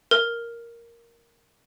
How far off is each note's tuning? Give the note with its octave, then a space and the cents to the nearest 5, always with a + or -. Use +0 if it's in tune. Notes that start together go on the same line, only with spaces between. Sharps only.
A#4 +0